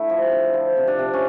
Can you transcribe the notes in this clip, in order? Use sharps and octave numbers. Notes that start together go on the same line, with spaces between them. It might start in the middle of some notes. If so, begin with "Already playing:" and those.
Already playing: D3 A3 E4
F3
D3
F3
C3
D4
C3
C#4